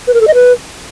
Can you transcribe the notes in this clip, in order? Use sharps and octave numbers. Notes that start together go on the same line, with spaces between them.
B4
A#4
A4
D#5
B4